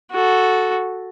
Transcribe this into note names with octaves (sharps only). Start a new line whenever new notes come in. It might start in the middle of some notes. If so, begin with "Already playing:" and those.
F#4 A4